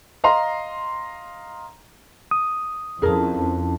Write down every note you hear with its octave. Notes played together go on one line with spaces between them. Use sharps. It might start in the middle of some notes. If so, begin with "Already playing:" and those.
D#5 F5 A#5 C6
D#6
F2 C#4 E4 G#4 A#4 A5